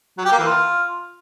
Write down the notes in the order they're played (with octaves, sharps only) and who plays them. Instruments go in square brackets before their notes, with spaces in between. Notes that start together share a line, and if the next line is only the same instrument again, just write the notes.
[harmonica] F#3
G4
A#3
E3
F4